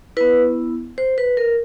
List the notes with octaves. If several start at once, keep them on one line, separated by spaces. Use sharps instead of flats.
B3 E4 B4
C5
B4
A#4